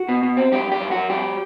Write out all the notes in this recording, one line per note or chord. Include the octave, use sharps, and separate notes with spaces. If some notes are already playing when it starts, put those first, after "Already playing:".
Already playing: F#4
B2
B2
C4
F#2 G4
F#2
G4
F#2
F#2 F#4
F#3 G4